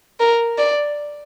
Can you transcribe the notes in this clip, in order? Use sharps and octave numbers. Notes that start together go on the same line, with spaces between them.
A#4
D5